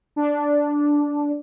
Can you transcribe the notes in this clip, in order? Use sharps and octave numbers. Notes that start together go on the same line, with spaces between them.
D4